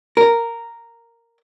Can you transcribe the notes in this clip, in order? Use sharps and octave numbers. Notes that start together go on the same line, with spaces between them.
A#4